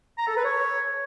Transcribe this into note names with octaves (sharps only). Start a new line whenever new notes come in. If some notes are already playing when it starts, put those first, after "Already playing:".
A#5
A4
B4
C#5